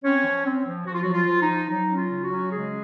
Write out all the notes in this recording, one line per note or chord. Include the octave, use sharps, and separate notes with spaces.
C4 C#4 C#5
F3
C4
F3
F3 F#4
F4
F3 F#3 F#4
F4
F3
D#4
F3
F#3 D#4
C#4
F4
C#3
F#3 F#4
C#4
C#3 G#3 G#4